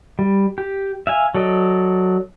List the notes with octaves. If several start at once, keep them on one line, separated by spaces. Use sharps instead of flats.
G3
G4
E5 F5 G#5
F#3 A4 D5 D#5